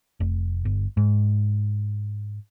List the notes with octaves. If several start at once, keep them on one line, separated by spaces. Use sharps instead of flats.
F1
G1
G#2